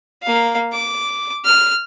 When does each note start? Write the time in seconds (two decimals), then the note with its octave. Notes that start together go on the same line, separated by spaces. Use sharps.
0.23 A#3 F5
0.73 D6
1.45 F6